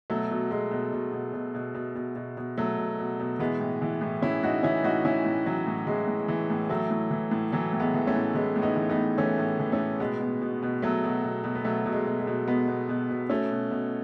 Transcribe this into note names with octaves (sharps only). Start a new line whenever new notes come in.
B2 F#3 A3
B2
B2 G#3
B2
B2
B2
B2
B2
B2
B2
B2
B2
B2 F#3 A3
B2
B2
B2
E3 G#3 B3
A2
E3
A2
E3 C#4 E4
A2 D#4 F#4
E3 C#4 E4
A2 D#4 F#4
E3 C#4 E4
A2
E3 F#3
A2
E3 G#3
A2
E3
A2
E3 F#3 A3
A2
E3
A2
E3 F#3 A3
A2
G#3 B3
E3
A3 C#4
A2
E3 G#3 B3
A2
B3 D#4
E3
B3 D#4
A2
E3 A3 C#4
A2
E3
A3 C#4
A2
B2 G#3 B3
B2
B2
B2
B2 F#3 A3
B2
B2
B2
B3
B2 F#3 A3
B2
G#3
B2
G#3
B2
B2 G#3 B3
B2
B2
B2
B2 A3 C#4
B2
B2